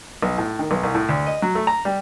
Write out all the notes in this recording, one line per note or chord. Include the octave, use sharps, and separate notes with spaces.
B1
A2
D#3
B1
C2
A2
D2
D#5
F#3
A3
A#5
G3